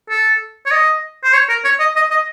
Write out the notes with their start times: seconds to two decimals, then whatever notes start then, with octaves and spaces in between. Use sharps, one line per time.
0.10 A4
0.66 C#5
0.72 D#5
1.24 C5
1.33 C#5
1.49 A#4
1.65 C#5
1.80 D#5
1.96 D#5
2.11 D#5